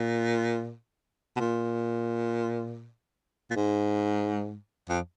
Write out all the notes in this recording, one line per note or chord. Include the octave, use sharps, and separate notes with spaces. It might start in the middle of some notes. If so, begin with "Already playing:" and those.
Already playing: A#2
B2
A#2
A#2
G#2
F2